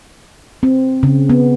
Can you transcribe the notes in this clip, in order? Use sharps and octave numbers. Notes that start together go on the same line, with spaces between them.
C4
C#3
B3